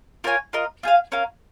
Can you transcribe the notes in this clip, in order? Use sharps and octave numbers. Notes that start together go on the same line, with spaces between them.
F4 A#4 C#5 G#5
F4 A#4 D#5
F4 G#4 F5
C#4 A#4 F5